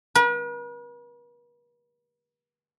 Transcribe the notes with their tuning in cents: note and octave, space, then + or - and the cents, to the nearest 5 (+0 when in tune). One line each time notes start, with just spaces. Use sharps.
B4 -45